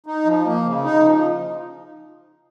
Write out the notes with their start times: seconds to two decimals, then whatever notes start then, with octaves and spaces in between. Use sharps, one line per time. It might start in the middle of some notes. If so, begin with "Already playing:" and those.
0.06 D#4
0.26 F3
0.46 A#3
0.65 C#3
0.85 D#4
1.04 F3